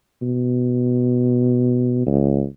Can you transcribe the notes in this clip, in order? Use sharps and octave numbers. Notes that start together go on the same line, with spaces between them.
B2
C#2